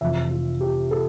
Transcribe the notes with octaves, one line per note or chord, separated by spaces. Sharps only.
F1 F2 E3 E5
F4
G4
A4